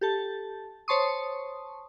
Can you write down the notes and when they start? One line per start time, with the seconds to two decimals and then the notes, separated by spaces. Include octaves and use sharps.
0.01 G4 A4 A5
0.88 C5 C#5 A5 C6 C#6 D#6